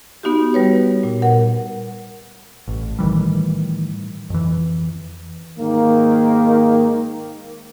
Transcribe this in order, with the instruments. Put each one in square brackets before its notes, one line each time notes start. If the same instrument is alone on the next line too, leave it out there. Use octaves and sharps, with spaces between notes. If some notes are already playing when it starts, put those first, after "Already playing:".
[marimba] B3 D#4 F#4 G4
G3 B4 C#5
A#2
A#4 F#5
[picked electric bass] A1
A2 D#3 E3 G3
F2 E3
[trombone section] G#2 D#3 A#3